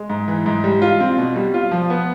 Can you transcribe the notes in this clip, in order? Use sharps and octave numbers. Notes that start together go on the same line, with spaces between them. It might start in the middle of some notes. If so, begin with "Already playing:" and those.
Already playing: G#3
G#2
E3
G#2
G3
F4
C4
B2
G3
F4
F3
B3